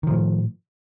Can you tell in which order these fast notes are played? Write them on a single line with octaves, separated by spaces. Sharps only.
D#3 F3 A2